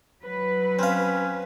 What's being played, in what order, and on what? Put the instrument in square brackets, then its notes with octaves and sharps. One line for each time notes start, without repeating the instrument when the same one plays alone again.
[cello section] F#3 B4
[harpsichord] C4 F5 [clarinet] C#4